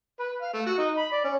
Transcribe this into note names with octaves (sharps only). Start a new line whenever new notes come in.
B4
F5
A3
F#4
D#4
B5
D5
C#4